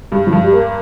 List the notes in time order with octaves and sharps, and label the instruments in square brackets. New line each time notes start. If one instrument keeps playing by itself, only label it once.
[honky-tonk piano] G2 [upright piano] C3
[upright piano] F3
[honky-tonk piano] G2
[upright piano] G3
[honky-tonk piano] A#3